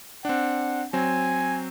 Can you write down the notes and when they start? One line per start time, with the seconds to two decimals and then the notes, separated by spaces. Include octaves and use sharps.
0.25 C4 D4 F#5
0.93 F#3 C4 G#5